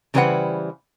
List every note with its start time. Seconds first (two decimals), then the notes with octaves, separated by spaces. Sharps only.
0.14 C#3 E3 G3 B4 C5 F#5